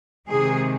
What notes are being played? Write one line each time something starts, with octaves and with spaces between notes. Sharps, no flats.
C3 D#3 G#3 G#4